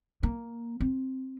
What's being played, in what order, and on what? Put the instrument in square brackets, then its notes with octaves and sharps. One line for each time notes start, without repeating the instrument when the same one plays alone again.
[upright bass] A#3
C4